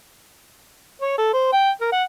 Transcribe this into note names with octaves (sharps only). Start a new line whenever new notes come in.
C#5
A4
C5
G5
A#4
F#5